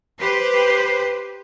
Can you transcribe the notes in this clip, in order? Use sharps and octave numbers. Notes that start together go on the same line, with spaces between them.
G4 B4 C5